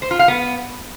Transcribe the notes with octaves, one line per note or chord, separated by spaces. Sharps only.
C5
F4
F5
B3